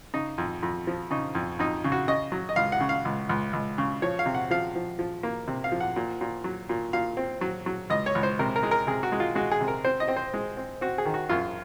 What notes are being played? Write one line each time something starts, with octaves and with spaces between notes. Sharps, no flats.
C#3 D#4
F2
F2
F3
C#3 D#4
F2
F2 D#4
C#3
F#4
C#3 D#5
F#3
D#5
C#2 F5
F#5
C#3
F5
C#2
C#2
C#2
C#3
F3 C#5
F5
C3
F#5
F3 F5
F3
F3
A#3
C3
F5
F3
F#5
A#2
A#2
F#3
A#2
A#2 F5
C4
F#3
F#3
C#2 D#5
C#5
C#2
C5
C3 A#4
A#4
G#3
A#4
C3 G#4
F#4
G#3
F4
G#3 F#4
G#4
C3
A#4
C4 C5
D#5
C4
C5
G#3
C4
C4 F#4
G#4
D#3
F#4
F#2 F4